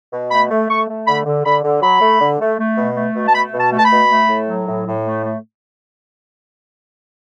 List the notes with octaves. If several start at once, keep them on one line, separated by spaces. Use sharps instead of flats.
B2
A3 B5
A3
A3 C#6
A3
D3 B5
D3
D3 B5
D3
F#3 B5
A3
D3
A3
A3
B2
A3
B2
A5
A3 B5
B2
A5
A3
A5
B5
B2
A3
A2
F#3
A2
A2
A3
A3